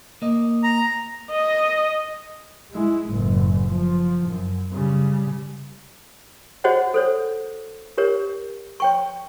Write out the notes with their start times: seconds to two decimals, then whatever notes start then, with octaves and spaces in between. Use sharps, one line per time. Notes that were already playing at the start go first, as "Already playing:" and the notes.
0.22 A#3 D#5
0.64 A#5
1.32 D#5
2.72 G#3 E4
3.09 F#1 A2
3.68 F3
4.29 F#2
4.71 C#3 G3
6.64 F#4 G#4 C5 C#5 D#5 F#5
6.94 A4 C5 C#5
7.98 G4 A#4 C#5
8.80 C#5 G5 C#6